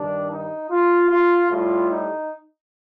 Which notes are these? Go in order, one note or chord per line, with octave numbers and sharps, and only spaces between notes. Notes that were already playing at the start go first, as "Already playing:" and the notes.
Already playing: G2 D#3 G3 D4
D#4
F4
F4
A2 G3 F4
D#4